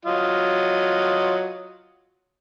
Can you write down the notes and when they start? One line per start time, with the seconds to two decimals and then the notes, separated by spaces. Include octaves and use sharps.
0.06 F#3 F4 D#5